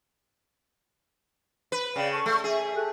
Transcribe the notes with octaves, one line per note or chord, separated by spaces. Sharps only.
B4
C#3 D5 F5 G5
A4 C#6
A3
G#4 E5 G#5
G4 A4 F#6